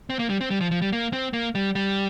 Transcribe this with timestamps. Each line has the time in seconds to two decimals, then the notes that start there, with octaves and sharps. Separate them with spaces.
0.10 C4
0.19 A#3
0.30 G3
0.41 C4
0.50 G3
0.61 F3
0.71 F3
0.82 G3
0.92 A#3
1.13 C4
1.33 A#3
1.55 G3
1.75 G3